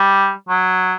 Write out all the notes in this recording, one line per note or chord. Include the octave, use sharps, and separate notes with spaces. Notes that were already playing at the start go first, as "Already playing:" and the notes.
Already playing: G3
F#3